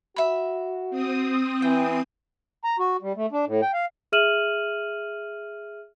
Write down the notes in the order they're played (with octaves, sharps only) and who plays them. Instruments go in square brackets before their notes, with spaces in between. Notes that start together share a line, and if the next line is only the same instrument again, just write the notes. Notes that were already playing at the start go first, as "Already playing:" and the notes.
[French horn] F#4 [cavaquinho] E5 B5
[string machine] C4 D#6
[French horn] E3 [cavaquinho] G5
[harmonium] A#5
F#4
G3
A3
D4
A2
G5
F5
[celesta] G#4 E5 F6 D#7 E7 F#7